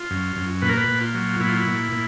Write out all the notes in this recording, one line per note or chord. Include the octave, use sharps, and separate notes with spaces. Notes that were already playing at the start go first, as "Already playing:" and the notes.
Already playing: F4
F#2
F#2
A#2 B4
A#4
B4
A#2
F4
F#3
A#2 E4
F4
E4
A#2
A#2